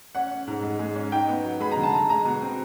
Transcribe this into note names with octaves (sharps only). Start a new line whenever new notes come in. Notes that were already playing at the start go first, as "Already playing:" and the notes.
C#4 F#5
C#4
G#2
G#3
G#3
C#4
D#4 G5
B3
F#3
G#3 B5
A#5
D3
A5
D3 A#5
G#3 A#5
B2
C4